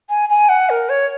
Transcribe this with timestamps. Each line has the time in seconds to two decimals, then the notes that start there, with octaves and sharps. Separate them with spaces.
0.09 G#5
0.29 G#5
0.49 F#5
0.70 A#4
0.89 C#5